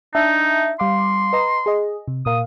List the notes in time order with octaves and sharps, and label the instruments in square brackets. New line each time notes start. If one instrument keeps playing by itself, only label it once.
[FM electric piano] D4 E5 A5 [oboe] D#4
[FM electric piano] G3 F5 D6 [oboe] C6
[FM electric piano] B4 D#5 A#5
G#4 D#5
C3
[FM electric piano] A#2 A#4 F5 [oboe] D#6